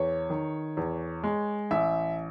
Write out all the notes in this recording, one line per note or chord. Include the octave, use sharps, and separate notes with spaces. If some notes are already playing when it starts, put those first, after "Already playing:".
Already playing: E2 C#5
D#3
E2
G#3
A1 E5